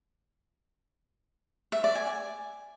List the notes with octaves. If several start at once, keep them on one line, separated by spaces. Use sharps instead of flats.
E5
D5
G#5
G#5